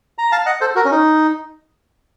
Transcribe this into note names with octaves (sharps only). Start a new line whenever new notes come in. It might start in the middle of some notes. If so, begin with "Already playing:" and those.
A#5
F5 A5
D#5 F#5
A4 C5
F#4 A#4
C#4
D#4